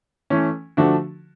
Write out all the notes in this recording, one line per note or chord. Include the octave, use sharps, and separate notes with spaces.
E3 A3 C#4
D3 F3 A3 D4 F#4